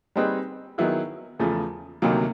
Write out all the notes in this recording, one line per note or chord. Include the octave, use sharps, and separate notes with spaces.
G3 C4 D#4 G#4 B4
D#3 F#3 B3 E4 G#4
E2 C#3 F3 A3
D2 C3 D#3 F#3 A#3